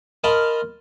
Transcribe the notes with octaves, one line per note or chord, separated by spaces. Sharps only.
A#4 D#5 F5 A5 B5 C6